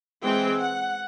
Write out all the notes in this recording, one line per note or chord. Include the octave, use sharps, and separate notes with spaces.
E3 G#3 C4 G5
F#5